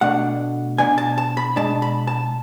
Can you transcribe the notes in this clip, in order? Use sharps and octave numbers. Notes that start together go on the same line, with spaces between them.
B2 A3 D4 F#5
B2 F#3 B3 D4 G#5
A5
A5
B5
B2 G#3 D4 A5
B5
A5